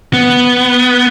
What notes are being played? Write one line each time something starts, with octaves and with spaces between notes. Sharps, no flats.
B3